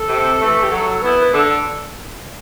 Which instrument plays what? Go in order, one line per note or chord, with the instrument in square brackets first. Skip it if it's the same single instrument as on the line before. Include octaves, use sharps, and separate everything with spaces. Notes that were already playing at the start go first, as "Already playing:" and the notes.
Already playing: [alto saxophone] A4
[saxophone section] C3
E3 A3
[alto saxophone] G4
[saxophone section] F#3 [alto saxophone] A4
[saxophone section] B3 E4 [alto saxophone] B4
[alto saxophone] B4
[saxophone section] D3 [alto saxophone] A4